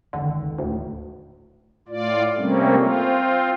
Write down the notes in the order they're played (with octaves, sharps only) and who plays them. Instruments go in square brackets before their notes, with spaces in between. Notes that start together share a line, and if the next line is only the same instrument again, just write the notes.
[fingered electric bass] F1 C#2 D#3 [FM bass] D3
[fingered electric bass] D1 A2 [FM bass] D2
[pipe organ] A2 F4 D5
C3 G3 A3 A#3 C4 C#4
C4 F4